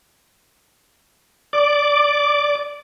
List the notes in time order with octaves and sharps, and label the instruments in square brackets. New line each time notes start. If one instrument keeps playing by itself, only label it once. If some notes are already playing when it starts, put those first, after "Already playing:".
[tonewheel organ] D5 D6